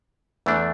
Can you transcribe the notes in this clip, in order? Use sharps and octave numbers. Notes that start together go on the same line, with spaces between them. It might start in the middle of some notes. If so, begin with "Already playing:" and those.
E2 E3 A3 D4